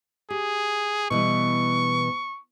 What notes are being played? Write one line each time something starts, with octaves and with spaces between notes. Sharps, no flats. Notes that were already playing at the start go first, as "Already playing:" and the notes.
G4 G#4
B2 E3 G3 C#6